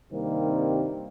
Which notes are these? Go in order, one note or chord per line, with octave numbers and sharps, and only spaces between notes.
G2 C3 D#3 G3 A#3 C4